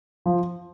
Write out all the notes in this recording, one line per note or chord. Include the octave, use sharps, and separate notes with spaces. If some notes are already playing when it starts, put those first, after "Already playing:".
F3